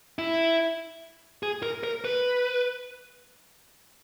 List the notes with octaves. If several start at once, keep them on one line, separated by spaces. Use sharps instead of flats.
E4
G#4
A#4
A#4
B4